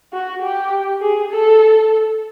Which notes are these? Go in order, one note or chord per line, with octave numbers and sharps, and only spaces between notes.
F#4
G4
G#4
A4